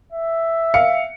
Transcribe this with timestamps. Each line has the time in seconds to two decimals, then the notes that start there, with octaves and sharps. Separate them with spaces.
0.13 E5
0.74 F5 C#7